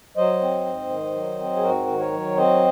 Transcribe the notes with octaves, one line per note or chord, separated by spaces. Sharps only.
F#3 C5 D#5
C4
G#2
D#3
F#3
C4
G#4
G#2 F#4 A#4
D#3
A#4 C#5
F#3
C4 C5 D#5